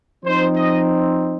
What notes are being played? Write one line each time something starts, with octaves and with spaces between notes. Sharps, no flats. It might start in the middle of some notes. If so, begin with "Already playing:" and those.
F3 C4 D#4 C5
D#5